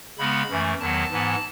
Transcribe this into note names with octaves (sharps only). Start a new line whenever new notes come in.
C#3 G#3 B3 B5
F#2 E3 A3
E2 D#3 F#3 B3 A5
G#2 E3 B3